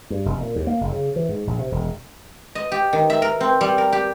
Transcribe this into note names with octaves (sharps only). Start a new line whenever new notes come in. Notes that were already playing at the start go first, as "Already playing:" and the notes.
G2
F1
A#2
D#2
A#3
F#1
C#3
E3
G#2
A#1
C3
E1
D#5
G4
D#3
E5
A#4
C4
G3
A#4
G4